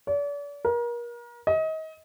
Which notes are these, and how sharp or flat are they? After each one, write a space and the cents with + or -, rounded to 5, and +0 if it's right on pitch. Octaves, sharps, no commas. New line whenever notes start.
D5 -40
A#4 +35
D#5 +30